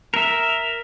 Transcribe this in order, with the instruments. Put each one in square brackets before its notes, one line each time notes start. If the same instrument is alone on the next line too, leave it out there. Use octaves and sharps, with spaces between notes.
[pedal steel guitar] A#4 E5